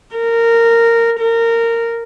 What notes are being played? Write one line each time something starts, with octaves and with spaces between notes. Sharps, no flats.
A#4
A#4